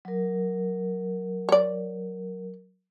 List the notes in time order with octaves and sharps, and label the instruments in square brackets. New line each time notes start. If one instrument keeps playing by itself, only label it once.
[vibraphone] F#3 A#4
[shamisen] C#5 D5